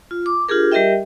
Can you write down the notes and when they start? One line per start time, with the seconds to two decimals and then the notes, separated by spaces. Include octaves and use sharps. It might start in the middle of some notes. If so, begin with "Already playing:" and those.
0.11 F4
0.26 D6
0.49 D4 F4 G4 G#4 A#4
0.72 G3 G4 A#4 D#5 E5 G5